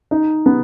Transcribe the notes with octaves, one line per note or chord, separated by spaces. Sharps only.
D#4
B3